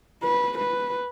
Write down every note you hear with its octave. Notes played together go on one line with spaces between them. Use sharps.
B4
B4